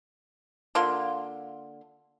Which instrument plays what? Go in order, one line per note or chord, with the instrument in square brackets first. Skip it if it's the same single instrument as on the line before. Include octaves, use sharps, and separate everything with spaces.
[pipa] D3 A#3 F4 C6